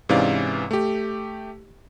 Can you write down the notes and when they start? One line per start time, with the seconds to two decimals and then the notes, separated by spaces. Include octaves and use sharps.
0.09 G#2 C3 E3 C#4 D5 F5
0.71 A3 G4